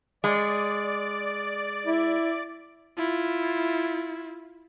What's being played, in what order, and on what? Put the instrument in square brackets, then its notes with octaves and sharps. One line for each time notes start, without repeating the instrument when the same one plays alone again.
[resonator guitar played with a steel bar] G#3 [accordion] D5
[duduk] E4
[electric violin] E4 F4